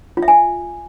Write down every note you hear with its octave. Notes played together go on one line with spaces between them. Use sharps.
F4
E5
G#5